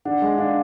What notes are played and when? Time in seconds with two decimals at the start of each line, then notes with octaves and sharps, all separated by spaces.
0.05 D4 F#5
0.22 G#3
0.38 D4 F5